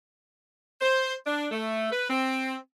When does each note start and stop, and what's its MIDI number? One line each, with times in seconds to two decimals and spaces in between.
0.81 1.14 72
1.26 1.46 62
1.51 1.91 57
1.92 2.08 71
2.10 2.55 60